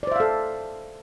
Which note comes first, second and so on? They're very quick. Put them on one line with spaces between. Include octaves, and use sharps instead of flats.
D5 C5 E5 F5 A4